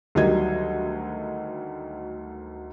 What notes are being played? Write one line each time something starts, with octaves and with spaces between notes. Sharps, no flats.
D2 D#3 F#3 G3 D#5 G#6